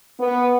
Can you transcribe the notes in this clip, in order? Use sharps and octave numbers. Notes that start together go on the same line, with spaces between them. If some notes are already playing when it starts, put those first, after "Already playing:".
B3